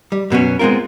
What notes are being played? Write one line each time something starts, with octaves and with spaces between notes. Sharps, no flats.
G3
F#2 B2 B3 C#4
G#3 B3 C4 F4 A#4